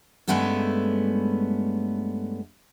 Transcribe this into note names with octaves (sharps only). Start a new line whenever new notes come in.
G2 G#3 A3 B3 C#4 A4